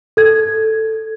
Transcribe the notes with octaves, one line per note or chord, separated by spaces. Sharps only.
A4 G#6